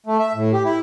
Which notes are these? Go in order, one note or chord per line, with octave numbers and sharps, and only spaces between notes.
A3
E5
A2
G4
E4